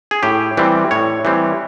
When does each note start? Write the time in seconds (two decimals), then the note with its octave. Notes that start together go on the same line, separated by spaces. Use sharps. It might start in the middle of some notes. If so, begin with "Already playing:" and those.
0.11 G#4
0.23 A2 G4
0.57 E3 G3 C4
0.91 A2 C#5
1.25 E3 G3 C4